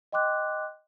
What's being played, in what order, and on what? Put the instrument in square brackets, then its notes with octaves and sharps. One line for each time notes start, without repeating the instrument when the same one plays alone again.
[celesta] D#5 G5 C6 D6 F#6